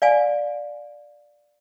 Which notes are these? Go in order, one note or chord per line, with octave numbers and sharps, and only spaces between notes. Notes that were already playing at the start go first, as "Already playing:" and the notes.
D5 F5 G#5